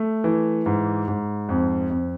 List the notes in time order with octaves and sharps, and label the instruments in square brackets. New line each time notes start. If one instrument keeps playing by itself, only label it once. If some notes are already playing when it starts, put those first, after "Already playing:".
Already playing: [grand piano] A3
E3
G#2
G#2
F2
F2